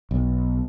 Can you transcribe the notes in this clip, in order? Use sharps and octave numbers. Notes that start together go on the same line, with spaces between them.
B1